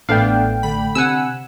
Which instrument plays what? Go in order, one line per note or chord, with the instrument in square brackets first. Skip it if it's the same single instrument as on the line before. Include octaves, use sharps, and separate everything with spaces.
[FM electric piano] A1 A3 G5 [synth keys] B3 D4 [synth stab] F5
[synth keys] D3 B5
[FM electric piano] C3 [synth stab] F#5 G#5 E6